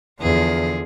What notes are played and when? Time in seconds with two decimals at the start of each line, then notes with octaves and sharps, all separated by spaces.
0.21 E2 D3 F3 G#4